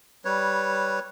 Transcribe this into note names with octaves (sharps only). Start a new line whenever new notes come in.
G3 B4 C#5